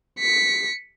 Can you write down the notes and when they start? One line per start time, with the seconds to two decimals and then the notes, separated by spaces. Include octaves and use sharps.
0.20 B6 C#7